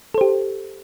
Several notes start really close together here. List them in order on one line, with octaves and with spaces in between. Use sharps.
A4 C5 G4